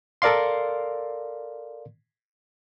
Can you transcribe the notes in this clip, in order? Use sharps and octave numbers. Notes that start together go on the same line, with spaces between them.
A4 A#4 D5 F5 C6